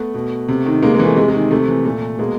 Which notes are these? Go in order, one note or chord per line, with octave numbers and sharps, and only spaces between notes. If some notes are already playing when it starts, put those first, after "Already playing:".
Already playing: A3 B3
B2
C3
D#3
C3 G#3 A#3
E3 G#3 A#3
A3
C3 G#3
G#3
D#3
C3 A3
E3
A#2 A3
B2 G#3 A#3